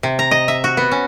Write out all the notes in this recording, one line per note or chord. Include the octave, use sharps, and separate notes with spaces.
C3
A#5
D#5
E5
F#4
B3
C#4